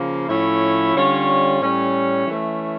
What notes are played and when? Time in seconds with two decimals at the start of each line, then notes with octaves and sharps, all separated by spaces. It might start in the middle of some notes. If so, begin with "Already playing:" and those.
Already playing: C#3 F3 A#3
0.28 A2 F3 C#4 E4
0.95 D3 G3 C#4 F4 C#5
1.61 A2 G3 C#4
2.27 E3 A3 C#4